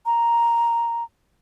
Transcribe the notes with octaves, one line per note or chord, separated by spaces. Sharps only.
A#5